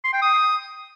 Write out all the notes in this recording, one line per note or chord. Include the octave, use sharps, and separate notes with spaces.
C6
G5
D#6